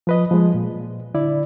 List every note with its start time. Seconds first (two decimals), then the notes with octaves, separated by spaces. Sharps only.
0.07 F3 B4 D#5
0.31 F3 G#3
0.54 A#2
1.14 D3 E4 D5